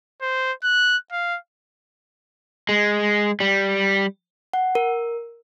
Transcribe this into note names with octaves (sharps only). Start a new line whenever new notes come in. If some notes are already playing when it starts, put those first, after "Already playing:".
C5
F#6
F5
G#3
G3
F#5
A#4